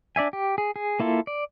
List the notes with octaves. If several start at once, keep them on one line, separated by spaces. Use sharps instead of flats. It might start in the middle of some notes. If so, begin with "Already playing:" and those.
D4 D5 E5 G#5
G4
G#4
G#4
A#3 E4 F4 A4
D5